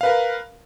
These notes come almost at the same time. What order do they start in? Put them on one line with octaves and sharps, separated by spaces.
F5 B4 A#4